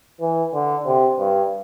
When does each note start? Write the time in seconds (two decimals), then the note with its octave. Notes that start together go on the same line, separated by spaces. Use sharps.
0.21 E3
0.54 D3
0.86 C3
1.19 G2